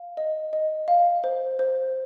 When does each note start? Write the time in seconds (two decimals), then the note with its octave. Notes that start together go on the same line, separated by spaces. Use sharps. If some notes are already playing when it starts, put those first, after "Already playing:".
Already playing: F5
0.17 D#5
0.53 D#5
0.88 F5
1.24 C5
1.59 C5